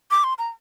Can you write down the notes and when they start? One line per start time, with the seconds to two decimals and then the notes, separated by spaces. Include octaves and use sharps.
0.11 D6
0.24 C6
0.38 A#5